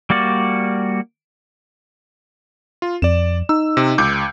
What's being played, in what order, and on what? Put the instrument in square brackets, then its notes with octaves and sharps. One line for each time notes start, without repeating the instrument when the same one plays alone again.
[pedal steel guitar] G3 A#3 F#4 D5
[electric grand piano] F4
[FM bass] F2 [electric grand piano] D5 E7
[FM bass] D#4 [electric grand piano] E6
[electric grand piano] C3
C#2 D6 G6